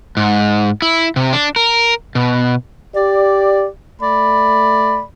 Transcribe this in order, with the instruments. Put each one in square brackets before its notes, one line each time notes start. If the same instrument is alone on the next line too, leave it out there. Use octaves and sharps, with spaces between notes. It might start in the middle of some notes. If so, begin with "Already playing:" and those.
[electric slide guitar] G#2
E4
C3
D4
A#4
B2
[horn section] G4 D5
A3 D5 B5